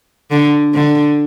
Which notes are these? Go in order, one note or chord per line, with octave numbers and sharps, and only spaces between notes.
D3
D3